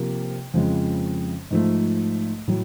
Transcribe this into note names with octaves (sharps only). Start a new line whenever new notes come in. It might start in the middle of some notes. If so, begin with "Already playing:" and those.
Already playing: C3 F3 A#3
F2 C#3 F3 G#3
G#2 F3 A3
A2 F#3